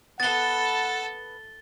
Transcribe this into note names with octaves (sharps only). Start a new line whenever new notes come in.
B3 A4 B4 F#5 A5 A6 G7